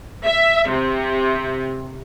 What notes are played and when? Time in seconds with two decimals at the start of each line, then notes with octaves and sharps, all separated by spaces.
0.24 E5
0.69 C3